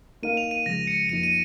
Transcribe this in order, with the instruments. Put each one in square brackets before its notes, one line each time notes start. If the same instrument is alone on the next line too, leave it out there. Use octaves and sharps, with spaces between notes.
[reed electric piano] A#3 D#4 A#4 F5 [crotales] D#7
[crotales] F7
D#7
[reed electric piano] C#3 F3 G#3 [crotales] A#6
[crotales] C#7
[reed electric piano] F2 F3 A#3 D#4 [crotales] D#7
[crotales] D#7